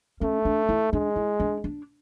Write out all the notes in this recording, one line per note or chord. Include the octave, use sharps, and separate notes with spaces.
A3 C#4
D4
E4
G#3 D4
E4
D4
D4